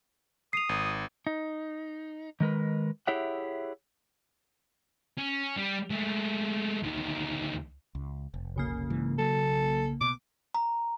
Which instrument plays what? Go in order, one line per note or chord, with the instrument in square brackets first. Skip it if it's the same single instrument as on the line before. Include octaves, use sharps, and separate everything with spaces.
[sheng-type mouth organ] D#6 [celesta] C7 F7
[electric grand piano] G#1
[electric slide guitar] D#4
D#3 G#3 A#4 B4
E4 G4 G#4 C#5 E5 F#5
[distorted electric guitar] C#4
G3
G#3 A3
D2 D#3
[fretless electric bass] C#2
F1
[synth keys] B1 C#3 A#3
[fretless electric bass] G#2 E3
[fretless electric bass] F#3 [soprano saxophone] A4
[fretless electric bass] B2 [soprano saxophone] D6
[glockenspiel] A#5